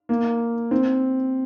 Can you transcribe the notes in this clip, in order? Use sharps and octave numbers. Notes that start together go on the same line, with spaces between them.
A#3
C4